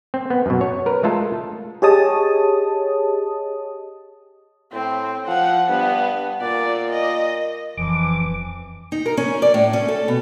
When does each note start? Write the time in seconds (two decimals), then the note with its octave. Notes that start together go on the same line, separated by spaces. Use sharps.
0.14 C4
0.30 B3
0.46 F#2 B2
0.61 C#5
0.86 A#4 B4
1.03 G#3 A3 F4 A4
1.82 G4 G#4 C#5 D#5 A5 D#6
4.72 A2 C4
5.28 F3 F#5
5.69 G2 B3
6.42 A#2 D5
6.91 D#5
7.77 D#1 F2 E3 F3 D6
8.92 D#4
9.06 A#4
9.17 C#4
9.42 D5
9.54 A2
9.73 C#4
9.88 A4
10.08 B2